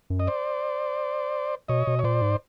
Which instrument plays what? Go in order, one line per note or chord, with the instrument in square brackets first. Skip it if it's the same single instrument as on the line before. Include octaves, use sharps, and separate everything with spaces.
[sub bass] F#2
[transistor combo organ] D#5
C5 D5
[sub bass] B2 [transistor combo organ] C#5 D#5
[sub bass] B2
[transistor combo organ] C#5
[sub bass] A#2 [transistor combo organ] C5 D5
[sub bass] G#2